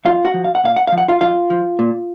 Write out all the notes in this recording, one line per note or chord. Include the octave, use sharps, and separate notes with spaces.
F2 F4 F5
F#4 F#5
F3
F5
F#5
A#2 F5
F#5
F3 F5
F#5
F4 F5
F2 F4 F5
F3
A#2